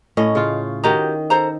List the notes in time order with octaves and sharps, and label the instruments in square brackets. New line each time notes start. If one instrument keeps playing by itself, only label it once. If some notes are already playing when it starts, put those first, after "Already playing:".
[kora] A2 C#4 [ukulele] D#5
[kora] C#3 F4
[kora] D#3 D#5 [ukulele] F#4 G4 A#5
[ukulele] A4 C5 A#5